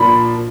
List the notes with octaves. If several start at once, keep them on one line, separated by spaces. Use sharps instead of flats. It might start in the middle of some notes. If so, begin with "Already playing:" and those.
Already playing: A#2 F3 D4 B5